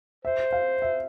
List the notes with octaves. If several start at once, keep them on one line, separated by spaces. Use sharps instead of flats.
C5 E5
F5
E5